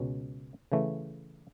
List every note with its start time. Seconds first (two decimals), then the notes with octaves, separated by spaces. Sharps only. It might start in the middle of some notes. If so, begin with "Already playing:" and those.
Already playing: C#2 B2 C#4
0.72 C#3 E3 A3